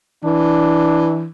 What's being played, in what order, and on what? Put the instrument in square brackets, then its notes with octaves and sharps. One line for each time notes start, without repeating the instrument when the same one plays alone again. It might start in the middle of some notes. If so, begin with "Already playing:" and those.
[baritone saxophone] E3 [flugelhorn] D4